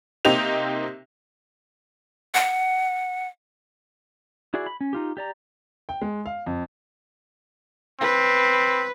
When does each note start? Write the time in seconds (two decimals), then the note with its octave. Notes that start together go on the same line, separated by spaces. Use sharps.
0.25 C3 A#3 C4 D#4 G4 F7
2.34 F#5
4.54 E4 F#4 G#4 D5
4.66 B5
4.81 C#4
4.93 D#4 F4 G4
5.17 G4 D5 A#5
5.89 G5
6.02 G#3
6.26 F5
6.46 F2
8.01 C4 B4